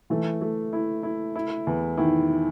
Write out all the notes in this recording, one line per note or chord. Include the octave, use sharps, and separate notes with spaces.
E3 A3
A3
E4
E4
E4
E2
D#3 E4